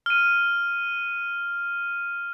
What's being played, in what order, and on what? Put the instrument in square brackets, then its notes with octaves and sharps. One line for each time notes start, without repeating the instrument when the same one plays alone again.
[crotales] F6 D#7